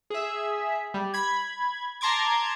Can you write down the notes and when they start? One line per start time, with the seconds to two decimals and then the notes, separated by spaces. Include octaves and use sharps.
0.10 G#4 E5
0.94 G3
1.14 B5 G#6
2.01 A5 A#5 C6 D6 G#6